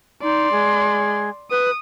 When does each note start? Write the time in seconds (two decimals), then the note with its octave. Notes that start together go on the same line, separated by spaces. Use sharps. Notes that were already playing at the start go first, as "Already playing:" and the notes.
0.22 D#4 D5 C6
0.51 G#3
1.51 B4 D#6